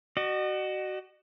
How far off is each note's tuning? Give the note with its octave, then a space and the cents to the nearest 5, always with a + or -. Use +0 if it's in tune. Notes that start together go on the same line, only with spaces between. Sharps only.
F#4 +20 D#5 -40